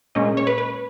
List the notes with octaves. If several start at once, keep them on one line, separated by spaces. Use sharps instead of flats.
A#2 G#3 C#4 D#5
C#5
B4
B4